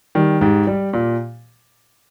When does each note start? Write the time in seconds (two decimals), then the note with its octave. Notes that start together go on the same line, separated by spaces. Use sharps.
0.15 D#3 G3
0.41 G#2 G4
0.67 G3
0.93 A#2